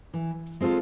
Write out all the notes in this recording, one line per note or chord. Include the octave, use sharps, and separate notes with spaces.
E3
G#3 C4 F4 A4